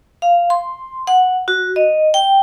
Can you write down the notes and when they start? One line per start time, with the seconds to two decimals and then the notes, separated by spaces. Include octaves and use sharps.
0.22 F5
0.50 C6
1.07 F#5
1.48 F#4
1.76 D#5
2.14 G5